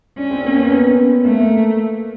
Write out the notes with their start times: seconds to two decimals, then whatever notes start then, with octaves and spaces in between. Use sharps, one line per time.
0.18 C#4 D4
0.31 C4
0.45 A#3
0.58 B3
0.71 B3
1.24 A3 A#3